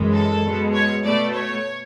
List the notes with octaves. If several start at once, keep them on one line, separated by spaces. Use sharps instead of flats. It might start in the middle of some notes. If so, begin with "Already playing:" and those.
Already playing: F#2 E3 G#3
A4
B2 G#3
C#5
B2 A3 D5
C#5